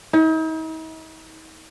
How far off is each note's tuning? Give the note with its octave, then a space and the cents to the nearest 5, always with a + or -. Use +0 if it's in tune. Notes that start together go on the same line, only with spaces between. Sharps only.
D#4 +45